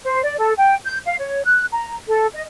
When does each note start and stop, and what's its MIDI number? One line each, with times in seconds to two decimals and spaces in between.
0.04 0.21 72
0.23 0.36 74
0.39 0.53 69
0.57 0.75 79
0.85 0.99 91
1.06 1.16 77
1.19 1.41 73
1.44 1.65 90
1.72 1.94 82
2.08 2.27 69
2.34 2.43 75